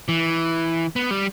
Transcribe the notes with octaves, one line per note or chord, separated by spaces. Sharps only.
E3
B3
G3